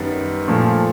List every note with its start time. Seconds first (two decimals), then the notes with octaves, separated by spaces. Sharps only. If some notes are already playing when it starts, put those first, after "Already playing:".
Already playing: F#2 D#3 G3 B3
0.48 A#2 F3 A3